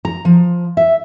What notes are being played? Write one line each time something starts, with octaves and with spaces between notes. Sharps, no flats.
A#5
F3
E5